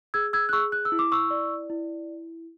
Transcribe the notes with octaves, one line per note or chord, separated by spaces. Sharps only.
G#4 E6 G#6
E6 G#6
F#6
G#4 C#6 E6
F#6
E6
E4
D6
C#6 E6
D5
E4